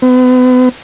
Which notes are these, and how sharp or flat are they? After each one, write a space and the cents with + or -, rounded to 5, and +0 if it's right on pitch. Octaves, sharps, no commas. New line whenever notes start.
B3 +35